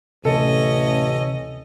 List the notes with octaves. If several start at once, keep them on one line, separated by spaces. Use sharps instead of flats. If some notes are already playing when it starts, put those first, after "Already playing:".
A1 D2 C3 C#4 A4 D#5